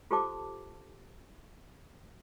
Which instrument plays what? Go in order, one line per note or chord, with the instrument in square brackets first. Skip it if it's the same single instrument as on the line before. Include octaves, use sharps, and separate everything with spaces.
[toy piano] F4 G4 A4 C5 A5 D6